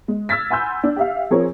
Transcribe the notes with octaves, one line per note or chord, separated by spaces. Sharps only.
G#3
E6 F6 G#6 A6 B6
F#5 G#5 B5 C6 E6 G6
D4
G4 E5 F5
F3 C4 G#4 A#4 C5 C#5